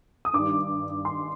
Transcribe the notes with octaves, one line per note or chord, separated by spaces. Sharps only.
D#6
G2 D#3 G3 D6
C6